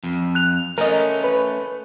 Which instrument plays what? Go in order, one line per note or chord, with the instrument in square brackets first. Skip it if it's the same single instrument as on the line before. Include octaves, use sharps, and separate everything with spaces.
[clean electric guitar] F2
[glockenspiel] F#6 F7
[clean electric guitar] A3 C#4 [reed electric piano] A#4 D#5
[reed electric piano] B4